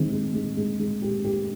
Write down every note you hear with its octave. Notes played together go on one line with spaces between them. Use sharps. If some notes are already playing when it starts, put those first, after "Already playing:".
Already playing: D#3 G#3 C4
G#3
G#3
G#3
G#3
G4
G4